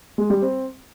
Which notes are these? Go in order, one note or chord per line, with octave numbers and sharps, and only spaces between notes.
G#3
G3
C4